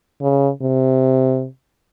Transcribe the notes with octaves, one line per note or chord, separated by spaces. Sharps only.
C#3
C3